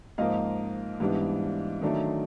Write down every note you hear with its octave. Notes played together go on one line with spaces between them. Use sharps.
G#2 F3 A#3 D#5 F5
G#2 E3 G3 B3 D4
D#3 F#3 A3 D4